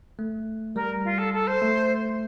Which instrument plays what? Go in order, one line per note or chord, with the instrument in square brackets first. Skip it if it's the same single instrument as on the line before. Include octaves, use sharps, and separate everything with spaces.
[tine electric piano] A3
[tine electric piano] G3 [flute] A#4
[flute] F4
A4
A4
C5
[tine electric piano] A3